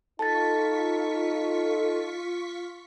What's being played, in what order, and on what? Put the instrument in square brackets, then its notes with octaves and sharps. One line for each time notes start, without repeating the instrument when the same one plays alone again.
[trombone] D#4 [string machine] F4 C#6 B6 [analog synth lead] A4 [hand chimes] A5 A6